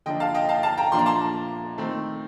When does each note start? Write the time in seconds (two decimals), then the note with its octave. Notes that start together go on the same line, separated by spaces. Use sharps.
0.06 D3 F3 A#3 D4 D#5 G5
0.20 F5 A5
0.34 D#5 G5
0.49 F5 A5
0.63 F5 A5
0.77 G5 A#5
0.92 A#2 F3 A#3 D4 C6
0.99 A#5
1.06 A5 C6
1.78 D#3 A3 C4